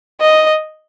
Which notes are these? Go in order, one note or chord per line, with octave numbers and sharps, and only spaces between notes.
D#5